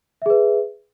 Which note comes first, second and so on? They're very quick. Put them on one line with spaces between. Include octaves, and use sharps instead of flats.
E5 G#4 B4